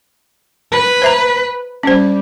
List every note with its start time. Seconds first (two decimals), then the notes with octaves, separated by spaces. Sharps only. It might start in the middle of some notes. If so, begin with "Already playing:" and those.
0.72 B4
1.02 C5 E5 A#5
1.83 G3 C#4 C5